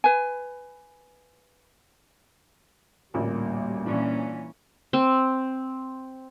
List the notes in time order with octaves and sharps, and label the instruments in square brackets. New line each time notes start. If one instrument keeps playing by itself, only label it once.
[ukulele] B4 G#5
[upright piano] A1 D2 A#2 [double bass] G3 A#3
[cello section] A#2 E3 C#4 [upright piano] D4
[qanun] C4